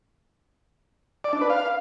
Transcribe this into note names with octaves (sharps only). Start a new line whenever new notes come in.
D5
D4
B4
F5